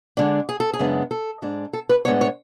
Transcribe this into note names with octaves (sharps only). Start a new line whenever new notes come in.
D3 G#3 D4
G#4
A4
G#4
F#2 C#3 G#3 B3 D4
A4
G#2 G#3 D4
A4
B4
A2 G#3 B3 D4 C#5
C#5